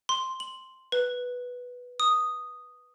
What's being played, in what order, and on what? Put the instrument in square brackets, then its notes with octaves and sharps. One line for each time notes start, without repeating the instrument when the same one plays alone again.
[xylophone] C6
F#7
B4
D#6